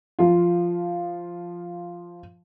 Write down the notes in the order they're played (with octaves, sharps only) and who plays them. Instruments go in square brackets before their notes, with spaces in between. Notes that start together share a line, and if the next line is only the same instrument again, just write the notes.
[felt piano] F3 F4